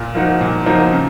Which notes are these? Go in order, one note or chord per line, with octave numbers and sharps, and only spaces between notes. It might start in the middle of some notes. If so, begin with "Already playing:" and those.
Already playing: A#2
F3 A#3 D#4 F#4
A#2
F3 A#3 D#4 F#4
C#3